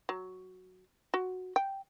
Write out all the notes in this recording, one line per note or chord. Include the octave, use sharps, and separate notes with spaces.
F#3
F#4
G5